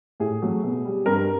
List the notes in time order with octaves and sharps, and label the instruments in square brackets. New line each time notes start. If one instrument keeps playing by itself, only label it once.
[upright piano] A2 G#4
F#3 A3
B2
G3
G2 A#4